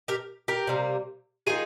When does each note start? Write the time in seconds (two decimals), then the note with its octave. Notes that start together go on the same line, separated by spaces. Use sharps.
0.08 G4 A#4
0.48 G4 A#4
0.67 C3 G3 A#3
1.47 D#3 G#3 F4 G#4